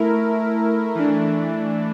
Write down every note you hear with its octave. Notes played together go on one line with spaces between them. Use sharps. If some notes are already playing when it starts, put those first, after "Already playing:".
Already playing: A3 E4 A#4
E3 A3 D4